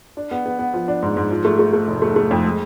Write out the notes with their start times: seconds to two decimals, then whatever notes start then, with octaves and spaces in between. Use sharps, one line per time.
0.17 D4
0.31 B3
0.46 B3
0.59 B3
0.74 F3
0.88 D4
1.03 G#2
1.17 G#2
1.31 F3
1.45 A3
1.59 A3
1.73 A3
1.88 F1
2.02 A3
2.16 A3
2.31 F2
2.44 G#3